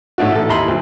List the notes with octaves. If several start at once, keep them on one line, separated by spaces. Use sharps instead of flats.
A2 A3 D4 F#4
A1 A4
D#2 D#4 E4 B5 C6
D2 F#3